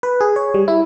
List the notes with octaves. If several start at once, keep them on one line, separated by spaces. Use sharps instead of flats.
B4
G#4
C#5
G3
E4